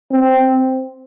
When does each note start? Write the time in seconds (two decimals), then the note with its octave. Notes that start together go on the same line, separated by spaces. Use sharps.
0.12 C4